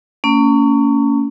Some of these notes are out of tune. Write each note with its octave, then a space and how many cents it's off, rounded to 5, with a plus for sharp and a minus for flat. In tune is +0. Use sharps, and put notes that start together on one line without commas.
A#3 -35 C#4 +20